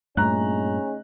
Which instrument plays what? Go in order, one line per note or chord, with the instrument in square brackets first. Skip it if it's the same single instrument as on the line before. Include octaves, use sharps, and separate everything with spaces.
[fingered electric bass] G2 A#2 [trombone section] C#3 C#4 D#4 [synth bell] A3 [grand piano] A#5 F#6